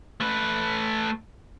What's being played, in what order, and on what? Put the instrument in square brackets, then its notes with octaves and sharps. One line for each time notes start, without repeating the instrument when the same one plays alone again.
[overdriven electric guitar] A3 B4